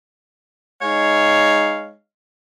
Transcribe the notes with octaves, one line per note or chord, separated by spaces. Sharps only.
G#3 D#4 C#5 F5